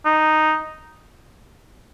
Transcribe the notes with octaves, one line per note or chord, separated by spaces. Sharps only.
D#4